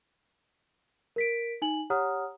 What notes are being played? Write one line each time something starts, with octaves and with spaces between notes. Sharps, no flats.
A#4 B6 D7
D#4 G#5 F#7
G4 C#5 F#5 A#5 D#6 F6